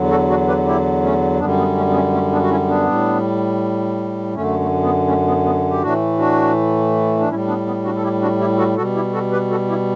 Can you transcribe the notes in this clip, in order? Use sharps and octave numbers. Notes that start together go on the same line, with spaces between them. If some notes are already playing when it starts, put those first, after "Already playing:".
Already playing: E2 D3 F#3
F#4 A4
D4 F#4
G4 B4
E4 G4
A3 C#4
F#2 D3 G3 B3 D4
B3
A3 C#4
B3
A3 C#4
A3 C#4
B3 D4
F#4
C#4 E4
B3 D4
A2 G3
F#2 D3 A3 C#4
A3
B3
A3 C#4
B3
B3
G4
A2 E3 A3 D4 F#4
D4 F#4
D4
A2 G3 C#4 E4
B3 D4
B3
D4 F#4
A4
E4 G4
D4 F#4
E4 G4
F#4 A4
B2 G3 F#4 A4
E4 G4
F#4 A4
G4 B4
F#4 A4
E4 G4